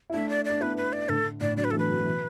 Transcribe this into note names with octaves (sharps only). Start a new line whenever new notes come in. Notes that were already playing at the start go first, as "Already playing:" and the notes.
E4
A3 D4 E5
D5
D4 D5
B3 E4 B4
B4
D5
A2 D3 A4
A2 D3 D5
D3 F#3 D5
B4
E3 A3 A4
B4
D3 F#3
F#3
B2 E3